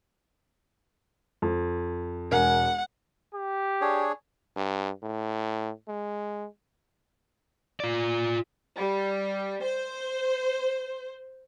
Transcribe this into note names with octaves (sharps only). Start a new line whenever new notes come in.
F2
E1 A#4 F#5 G#5
G4
D4 G#4 C#5
G2
A2
G#3
F4 D5
G3
C5